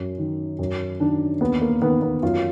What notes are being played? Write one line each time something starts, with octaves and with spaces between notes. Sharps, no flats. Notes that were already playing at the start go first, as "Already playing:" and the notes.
Already playing: F#2
D#3
F#2
D#3 D4
D#2 B3
A#3
D#3 B3
B3
F#2 F4